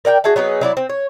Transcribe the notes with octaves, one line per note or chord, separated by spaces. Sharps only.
A#4 D5 F#5 G5
F#4 G#4 E5 A5
F#3 B3 D#4 G#4
F#3 E4 D5
C4
C#5